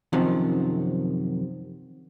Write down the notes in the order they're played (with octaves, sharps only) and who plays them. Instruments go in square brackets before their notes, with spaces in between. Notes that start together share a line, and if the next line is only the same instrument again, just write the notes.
[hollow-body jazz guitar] F#2 C3 D#3 F3 F#3